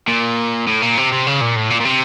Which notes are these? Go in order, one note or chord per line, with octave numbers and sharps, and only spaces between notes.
A#2
A2
A#2
C3
C3
C#3
A#2
A2
A#2
A#2
C3